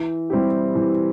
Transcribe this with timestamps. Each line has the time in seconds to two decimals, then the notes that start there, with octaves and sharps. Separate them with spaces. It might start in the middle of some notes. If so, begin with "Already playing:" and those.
Already playing: E3
0.30 G3 C4 E4 G4
0.75 E3